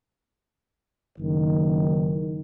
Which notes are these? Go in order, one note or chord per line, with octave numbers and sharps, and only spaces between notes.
F#1 D#3